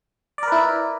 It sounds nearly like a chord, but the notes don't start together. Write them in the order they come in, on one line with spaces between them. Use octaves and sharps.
D5 A#4 B4 E4